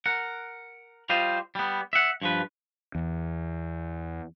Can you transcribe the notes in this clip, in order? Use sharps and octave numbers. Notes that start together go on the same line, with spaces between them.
A#4 F#5
G3 F4 C5 D#5
G3 B3
E5 F#5
G2 F3 B4
E2